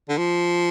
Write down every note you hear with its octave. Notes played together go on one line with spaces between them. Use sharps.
D3
F3